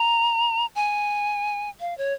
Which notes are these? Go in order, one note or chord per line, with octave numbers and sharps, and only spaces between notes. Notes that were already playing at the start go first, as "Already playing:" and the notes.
Already playing: A#5
G#5
F5
C#5